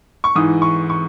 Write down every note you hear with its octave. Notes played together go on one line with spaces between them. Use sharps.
C#6
G#2 E3 D#6
C#6
C#6